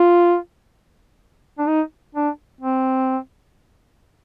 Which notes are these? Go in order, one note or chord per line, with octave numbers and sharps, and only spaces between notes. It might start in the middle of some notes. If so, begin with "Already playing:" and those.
Already playing: F4
D4
D#4
D4
C4